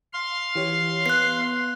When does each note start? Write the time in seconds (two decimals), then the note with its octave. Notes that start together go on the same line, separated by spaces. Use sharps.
0.13 F5 C6
0.55 E3 G4 C#5
1.06 B3 F#6 C7